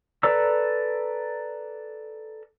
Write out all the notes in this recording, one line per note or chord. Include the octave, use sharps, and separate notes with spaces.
A4 B4 D5 A#5 E6